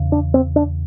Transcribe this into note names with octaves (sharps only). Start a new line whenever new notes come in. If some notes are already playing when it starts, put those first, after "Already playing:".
Already playing: E2 C#3
D4
C4
D4